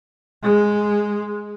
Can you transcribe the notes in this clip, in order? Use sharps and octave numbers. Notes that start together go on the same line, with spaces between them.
G#3